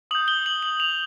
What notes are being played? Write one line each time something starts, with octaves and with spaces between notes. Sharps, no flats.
D#6 G6 F#7
G7
F#7
F#7
F7